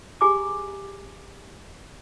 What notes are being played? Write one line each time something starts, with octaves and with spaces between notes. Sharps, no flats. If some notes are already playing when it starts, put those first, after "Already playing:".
G4 G#4 G#5 A#5 D6